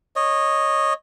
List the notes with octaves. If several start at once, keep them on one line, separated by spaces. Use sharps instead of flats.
C#5 D#5